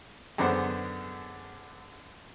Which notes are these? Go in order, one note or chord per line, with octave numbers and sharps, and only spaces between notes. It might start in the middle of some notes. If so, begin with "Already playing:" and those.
F#2 D3 G#3 B3 C5